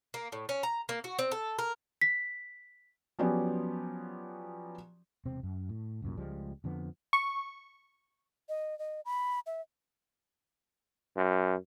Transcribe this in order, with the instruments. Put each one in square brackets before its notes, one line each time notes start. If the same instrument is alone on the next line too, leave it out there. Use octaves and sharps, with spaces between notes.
[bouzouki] A#3
A2
C#4
A#5
A#3
F#4
C4
A4
A#4
[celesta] B6
[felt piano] F3 F#3 B3 C#4 G4 D5
[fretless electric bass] E1 C3 C4
F#2
A2
C2 F#2 A#2
C#2 F3 G3 G#3
F2 D3 F3 B3
[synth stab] C#6
[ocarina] D#5
D#5
B5
E5
[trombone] F#2